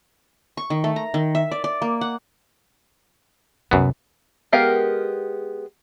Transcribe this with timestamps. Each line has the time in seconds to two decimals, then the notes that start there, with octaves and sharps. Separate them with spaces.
0.57 C#6
0.70 D#3
0.84 A3
0.96 A#5
1.14 D#3
1.35 E5
1.52 D5
1.64 D5
1.82 A#3
2.01 F#5
3.71 C2 F#2 B3
4.52 G#3 B3 G4 A#4 F5